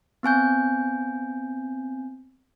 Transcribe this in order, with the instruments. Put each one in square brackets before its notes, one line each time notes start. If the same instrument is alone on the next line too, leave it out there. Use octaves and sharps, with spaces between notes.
[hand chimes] B3 C4 G#5 G6